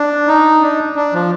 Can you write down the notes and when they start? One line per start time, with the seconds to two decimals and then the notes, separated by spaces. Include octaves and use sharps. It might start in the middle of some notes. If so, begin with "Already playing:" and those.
Already playing: D4
0.27 D#4
0.62 D4
0.96 D4
1.13 F3